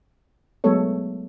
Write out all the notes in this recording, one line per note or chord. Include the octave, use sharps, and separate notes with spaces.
F#3 G#3 A3 B3 A4 C#5